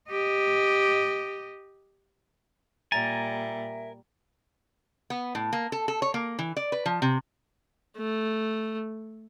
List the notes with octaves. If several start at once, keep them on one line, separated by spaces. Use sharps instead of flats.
G4 D#5
A#2 G3 A#4 E5 G#5 A#5 A6
B3
A2
A#3
A4
A4
C#5
A#3
E3
D5
B4
F3
C3
A3